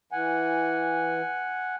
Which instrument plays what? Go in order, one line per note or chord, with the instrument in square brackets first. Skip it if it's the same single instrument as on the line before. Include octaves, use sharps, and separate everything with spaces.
[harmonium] E3 [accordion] F#5 G#5